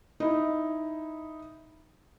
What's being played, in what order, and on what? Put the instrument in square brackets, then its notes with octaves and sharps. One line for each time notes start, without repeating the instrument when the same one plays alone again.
[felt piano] D#4 E4